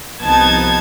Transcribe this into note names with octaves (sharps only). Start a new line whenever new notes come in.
C2 F3 B3 D#4 A5 G#6